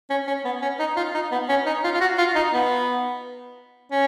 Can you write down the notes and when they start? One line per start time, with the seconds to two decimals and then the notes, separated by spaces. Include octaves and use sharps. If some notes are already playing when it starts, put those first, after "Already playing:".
0.10 C#4
0.27 C#4
0.45 B3
0.62 C#4
0.79 D#4
0.97 F4
1.14 D#4
1.32 B3
1.49 C#4
1.66 D#4
1.84 F4
1.94 F4
2.01 F#4
2.18 F4
2.35 D#4
2.53 B3
3.92 C#4